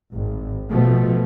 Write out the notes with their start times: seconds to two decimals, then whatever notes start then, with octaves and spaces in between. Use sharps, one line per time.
0.14 G#1
0.69 B2 F3 A3